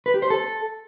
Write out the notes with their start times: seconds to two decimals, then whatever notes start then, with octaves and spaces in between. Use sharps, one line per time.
0.06 B4
0.14 G4
0.22 C5
0.30 A4